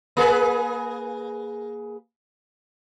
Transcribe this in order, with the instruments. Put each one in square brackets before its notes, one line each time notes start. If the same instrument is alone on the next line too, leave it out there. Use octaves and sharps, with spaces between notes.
[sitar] A#3 G#4 B4